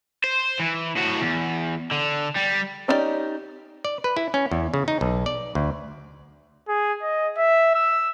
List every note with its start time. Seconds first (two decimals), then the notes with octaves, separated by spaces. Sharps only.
0.24 C5
0.59 E3
0.96 A2 F#4
1.21 E2
1.91 D3
2.36 G3
2.88 C#4 D#4 E4 G4 D5
3.85 D5
4.04 B4
4.17 E4
4.34 C#4
4.52 E2
4.74 C#3
4.88 D#4
5.01 B1
5.26 D5
5.55 D2
6.68 G#4
7.02 D#5
7.37 E5
7.75 E6